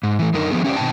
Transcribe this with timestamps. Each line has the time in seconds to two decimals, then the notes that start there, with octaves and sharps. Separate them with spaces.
0.03 G#2
0.19 E3 A3
0.33 F#2 D3 D#4 A#4
0.51 D3 F3 A3 B3 G#4
0.64 C#4 G4 A4 C5 D5
0.76 B2 D#3 C4 G5 A5